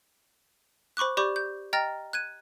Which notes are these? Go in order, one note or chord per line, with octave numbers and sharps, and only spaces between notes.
C5 B5 C#6 D6 F#6
G4 D5 B5 C#6 D6 G6
G6
D#5 G5 A#5 F6 A6 A#6
F#6 G#6 D#7